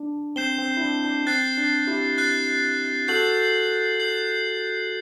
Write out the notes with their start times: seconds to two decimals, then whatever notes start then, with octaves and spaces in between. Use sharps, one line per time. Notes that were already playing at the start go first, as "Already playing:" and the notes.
Already playing: D4
0.36 C4 G6 C7 E7 G7
0.59 C4
0.77 E4
0.81 D4
1.05 D4
1.27 C4 F#6 A6 C7
1.57 D4
1.87 E4 G4
2.18 F#6 A6 C7
3.08 F#4 A4 G6 C7 F#7
4.00 G6 C7 F#7